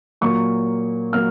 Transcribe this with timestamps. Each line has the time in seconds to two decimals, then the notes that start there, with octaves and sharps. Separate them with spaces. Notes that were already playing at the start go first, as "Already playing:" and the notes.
0.21 A#2 F#3 A#3 C#6
1.13 F#3 A#3 F6